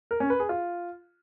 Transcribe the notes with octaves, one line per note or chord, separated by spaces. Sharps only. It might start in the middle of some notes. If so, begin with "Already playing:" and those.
A#4
C#4
B4
G#4
F4